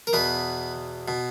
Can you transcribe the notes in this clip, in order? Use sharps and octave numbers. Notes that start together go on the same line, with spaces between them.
A#4
E2 B2 B4
B2